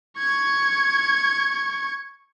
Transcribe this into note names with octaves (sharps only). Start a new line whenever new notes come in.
C#6 G#6